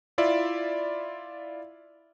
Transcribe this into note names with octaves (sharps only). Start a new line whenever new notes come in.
E4 F4 D5 E5